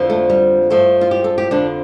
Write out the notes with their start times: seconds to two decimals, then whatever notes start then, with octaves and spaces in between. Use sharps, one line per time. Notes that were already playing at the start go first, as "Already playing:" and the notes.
Already playing: F2 D3 F3
0.10 A3
0.29 G3
0.70 G2 F3 A3
1.01 F4
1.11 G4
1.24 A4
1.38 G4
1.51 F2 D3 F3 D4